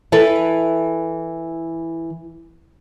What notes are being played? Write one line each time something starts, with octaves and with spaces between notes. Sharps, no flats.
E3 E4 A4 B4